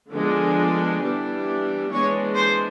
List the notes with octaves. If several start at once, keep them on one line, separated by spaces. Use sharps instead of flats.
D3 F3 G#3 B3 D4
E3 G3 B3 D4
E3 G#3 B3 D4 C#5
C5